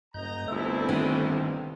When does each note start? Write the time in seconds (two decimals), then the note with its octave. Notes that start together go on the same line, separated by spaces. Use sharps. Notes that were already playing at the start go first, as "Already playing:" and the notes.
0.14 F#1 G2 D#5 A#5 G6
0.48 G1 C2 G#3 A3 C4 E4 A4
0.89 D#3 D4